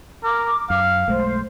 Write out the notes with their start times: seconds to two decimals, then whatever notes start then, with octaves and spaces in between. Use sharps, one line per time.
0.24 A#4 D6
0.70 F#2 F5
1.08 B1 G#3 A3 C5